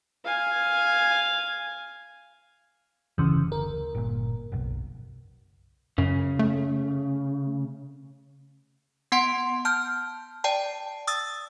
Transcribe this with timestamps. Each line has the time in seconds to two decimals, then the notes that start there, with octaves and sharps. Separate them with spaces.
0.25 F5 G#5
3.18 F#1 D2 C#3 E3
3.52 A#4
3.94 G1 A#2
4.52 F#1 B1
5.98 F#2 C#3
6.39 A3
9.12 B3 F#5 C6 D7
9.65 A5 F6 G6
10.44 D5 G5 A5
11.07 D#6 E6 A6